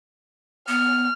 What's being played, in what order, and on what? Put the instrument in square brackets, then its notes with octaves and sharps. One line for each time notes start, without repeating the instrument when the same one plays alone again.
[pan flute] B3 [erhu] F6